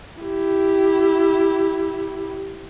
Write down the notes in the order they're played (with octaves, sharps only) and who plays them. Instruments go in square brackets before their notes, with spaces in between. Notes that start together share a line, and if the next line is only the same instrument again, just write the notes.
[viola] E4 G4